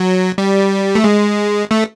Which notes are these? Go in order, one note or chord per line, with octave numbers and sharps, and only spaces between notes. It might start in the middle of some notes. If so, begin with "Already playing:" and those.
Already playing: F#3
G3
A3
G#3
A3